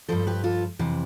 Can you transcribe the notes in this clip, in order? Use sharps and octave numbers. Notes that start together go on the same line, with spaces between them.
G2 F3 A4 C5
G4 B4
F4 A4
F2 C3 E3